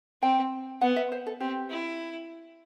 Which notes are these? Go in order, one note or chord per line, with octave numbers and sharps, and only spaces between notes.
C4 G5
B3 F#5
E5
C5
A4
C4 G4
E4